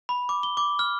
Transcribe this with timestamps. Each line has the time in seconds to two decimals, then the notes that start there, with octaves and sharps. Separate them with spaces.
0.09 B5
0.29 D6
0.43 G7
0.57 D6
0.79 F6